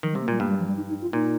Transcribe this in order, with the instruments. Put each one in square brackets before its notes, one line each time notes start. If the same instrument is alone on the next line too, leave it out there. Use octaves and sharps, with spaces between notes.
[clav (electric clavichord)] D#3 [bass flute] F3
[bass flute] G3
[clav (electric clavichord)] C3
[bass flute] A#3
[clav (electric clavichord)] A#2 [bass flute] G3
[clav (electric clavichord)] G2 [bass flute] A#3
[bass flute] G3
F3
G3
D#4
D#4
F4
[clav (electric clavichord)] A#2 [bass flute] D#4